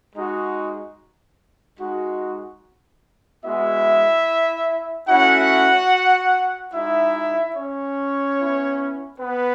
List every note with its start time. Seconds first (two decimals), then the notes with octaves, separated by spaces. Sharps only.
0.16 G#3 D#4 F#4
1.80 G#3 D#4 F#4
3.44 G#3 B3 E4 F#4 E5
5.08 A3 C#4 E4 F#4 F#5
6.73 G#3 D#4 E4 F#4 E5
7.56 C#4 C#5
8.39 B3 E4
9.20 B3 B4